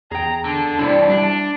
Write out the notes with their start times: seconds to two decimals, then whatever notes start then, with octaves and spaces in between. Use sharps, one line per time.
0.11 E2 G#4 G5 A#5
0.45 D3 A5
0.79 G2 C3 D4 E4 D5
1.09 G3 D4